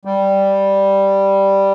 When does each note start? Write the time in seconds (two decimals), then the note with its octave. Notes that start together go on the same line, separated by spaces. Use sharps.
0.05 G3